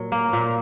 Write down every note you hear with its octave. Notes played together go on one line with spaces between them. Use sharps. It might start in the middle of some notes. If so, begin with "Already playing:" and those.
Already playing: A#2 F#3
A#3
A#2